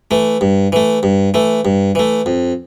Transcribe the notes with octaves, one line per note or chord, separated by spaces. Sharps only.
E3 A3
G2
E3 A3
G2
E3 A3
G2
E3 A3
F2